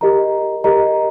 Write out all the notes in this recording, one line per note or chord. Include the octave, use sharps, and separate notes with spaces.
G4 A#4 D#5 A#5
G4 A#4 D#5 A#5